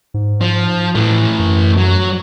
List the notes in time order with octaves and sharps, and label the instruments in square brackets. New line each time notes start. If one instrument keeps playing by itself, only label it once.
[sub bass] G#2
[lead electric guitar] F3
[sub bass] A2 [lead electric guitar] E3 A3
[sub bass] F#2
[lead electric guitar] F#3